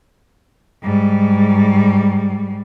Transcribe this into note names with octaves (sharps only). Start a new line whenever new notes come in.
G#2 G3